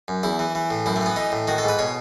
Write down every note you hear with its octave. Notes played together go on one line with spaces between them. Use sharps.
F#2
E2 E4
E3
E3
A2
F#2 E4
A3
E3 B3
E3 D#4
A2
D#3 F#4
A4
G#2 B4
B2 C#5